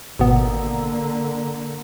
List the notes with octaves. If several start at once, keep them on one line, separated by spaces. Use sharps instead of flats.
G#1 B2 D3 A#3 B3